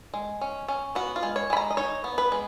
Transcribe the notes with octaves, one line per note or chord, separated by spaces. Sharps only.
G#3
C#4
C#4
B3 F#4
F4
G#3
C#5
G#3 B5
A#5
D#5
D#4 C#5
B3
B4
G#3